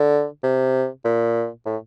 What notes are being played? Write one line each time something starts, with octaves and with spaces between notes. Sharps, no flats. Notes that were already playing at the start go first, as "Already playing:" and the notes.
Already playing: D3
C3
A#2
A2